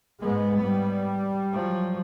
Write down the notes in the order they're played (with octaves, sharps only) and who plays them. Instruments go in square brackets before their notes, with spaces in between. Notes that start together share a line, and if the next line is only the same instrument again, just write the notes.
[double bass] G#2 B3 [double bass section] G#3
[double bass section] G3
[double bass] F3 F#3